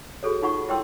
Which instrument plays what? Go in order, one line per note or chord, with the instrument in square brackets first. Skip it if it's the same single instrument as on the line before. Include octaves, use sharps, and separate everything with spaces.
[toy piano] F#4 G#4 A4 C#5
D#4 F4 F#5 C#6
E4 A#4 C#5 G5 C6 E6